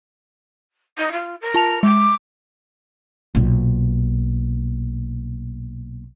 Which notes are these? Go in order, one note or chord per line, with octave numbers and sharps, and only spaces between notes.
D#4
F4
A#4
F4 A5 F7
G#3 D6
B1 A#2